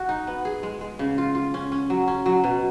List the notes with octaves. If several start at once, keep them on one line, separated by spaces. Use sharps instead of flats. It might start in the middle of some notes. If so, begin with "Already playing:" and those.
Already playing: F#4
D#4
B3
G#4
G#3
G#3
C#3
F4
F4
C#4
C#4
F#3
C#4
F#3
B2